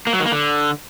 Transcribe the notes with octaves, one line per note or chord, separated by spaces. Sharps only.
A#3
F#3
D#3
A#3
D3